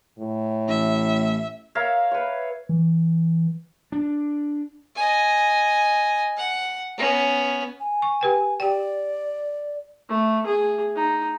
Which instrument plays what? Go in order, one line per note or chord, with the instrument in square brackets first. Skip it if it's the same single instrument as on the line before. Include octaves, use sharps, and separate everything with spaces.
[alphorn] A2
[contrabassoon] A1 [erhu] E5
[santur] A#4 C#5 E5 F5
B4 C#5
[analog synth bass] E3
[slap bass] D4
[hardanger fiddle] D#5 G#5
F#5
B3 C#4
[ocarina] G#5
[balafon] C#6
G4 B4 G5
[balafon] G4 G5 [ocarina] D5
[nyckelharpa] A3
G#4
D#4